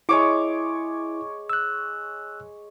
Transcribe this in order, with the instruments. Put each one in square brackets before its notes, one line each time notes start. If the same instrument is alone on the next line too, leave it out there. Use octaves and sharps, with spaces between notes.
[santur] G#3 C#5 D6 [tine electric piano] E4
[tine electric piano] E6 F#6